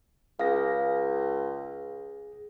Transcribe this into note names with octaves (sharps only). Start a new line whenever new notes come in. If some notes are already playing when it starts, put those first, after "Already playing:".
C#2 G#4 F5 A#6